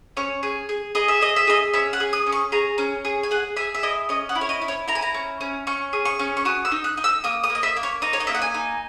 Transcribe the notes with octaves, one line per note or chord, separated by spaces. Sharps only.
C#4 C#5
G#4
G#4
G#4 D#5
E5
G#4 D#5
E5
G#4 D#5
C#4 E5
F#5
G#4
D#6
C#4
C#6
G#4 A#5
C#4
G#4
G#5
G#4 F#5
G#4 E5
E5
E4 D#5
C#4 D#5
F#5
E4
C#5
D#5
E4
C#5
E4 A#5
G#5
A#5
C#4
C#4
C#4 C#6
G#4
C#6
C#4
C#6
F#4 D#6
E6
D#4
F#6
D#4
E6
A#3 D#6
D#6
A#3
D#5
E5
A#3
C#5
D#4 A#5
C#5
D#5
A#3 E5
F#5
G#5
D#4